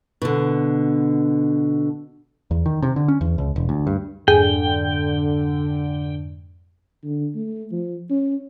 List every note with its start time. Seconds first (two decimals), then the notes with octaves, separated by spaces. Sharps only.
0.22 B2 D3
2.51 E2
2.66 D#3
2.82 C3
2.96 D3
3.08 C#4
3.21 E2
3.38 C#2
3.56 E1
3.69 D2
3.87 G2
4.28 F2 G#2 D3 G#4 G5
7.04 D3
7.35 A3
7.72 F3
8.10 C#4